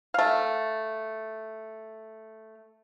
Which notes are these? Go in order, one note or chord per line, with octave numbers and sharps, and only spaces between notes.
A3 F5